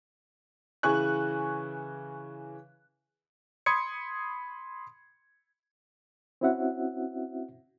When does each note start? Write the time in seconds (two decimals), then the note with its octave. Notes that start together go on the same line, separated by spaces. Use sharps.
0.83 C#3 E3 G#5 C#6 F#6
3.66 B5 C6 D#6 G#6 C#7
6.41 C4 C#4 E4 F#4 E5 F#5